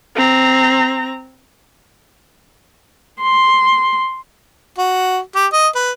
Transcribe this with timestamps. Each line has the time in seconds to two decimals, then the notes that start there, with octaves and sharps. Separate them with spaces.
0.16 C4 A#5
3.22 C6
4.78 F#4
5.35 G4
5.52 D#5
5.75 B4